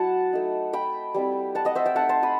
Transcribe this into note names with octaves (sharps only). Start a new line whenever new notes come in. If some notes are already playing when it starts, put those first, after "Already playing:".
Already playing: F#3 E4 F#5 A5
A3 D#4
G5 B5
G3 C4 E4
F#5 A5
D#5 F#5
C5 E5
E5 G5
A3 D#4 F#5 A5
A5 C6
B5 D#6